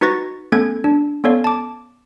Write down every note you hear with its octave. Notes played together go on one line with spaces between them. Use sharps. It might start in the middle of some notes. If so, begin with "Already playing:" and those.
D#4 F#4 B4 C#6 A6 A#6
A3 B3 C#4 A4 G#6
D4
B3 C#4 A4 C#5 D5 F5
A5 D6